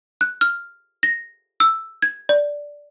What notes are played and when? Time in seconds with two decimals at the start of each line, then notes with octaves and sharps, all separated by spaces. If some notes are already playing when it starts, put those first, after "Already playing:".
0.21 F#6
0.41 F6
1.03 A#6
1.60 E6
2.02 G#6
2.29 D5